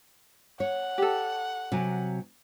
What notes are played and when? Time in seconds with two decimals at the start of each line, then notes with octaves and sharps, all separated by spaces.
0.60 C#5 F#5
0.98 G4 A4
1.72 C3 F#3 G#5